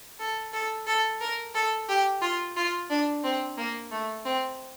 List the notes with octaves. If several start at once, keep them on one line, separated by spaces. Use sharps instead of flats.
A4
A4
A4
A#4
A4
G4
F4
F4
D4
C4
A#3
A3
C4